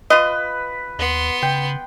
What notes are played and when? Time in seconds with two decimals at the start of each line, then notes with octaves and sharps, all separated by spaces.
0.10 F4 B4 D#5
0.98 D#2 B3 C6
1.42 C#3 G5